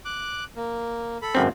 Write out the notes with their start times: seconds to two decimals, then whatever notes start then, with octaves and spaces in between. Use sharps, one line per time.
0.05 D6 F#6
0.56 A#3
1.22 A4 B5
1.35 G#1 F#2 C4